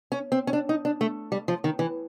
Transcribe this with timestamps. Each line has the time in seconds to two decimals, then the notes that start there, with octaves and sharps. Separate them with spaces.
0.12 C#4
0.32 C4
0.47 C#4
0.53 D4
0.69 D#4
0.85 D4
1.01 A3
1.32 G3
1.48 F3
1.64 D#3
1.79 E3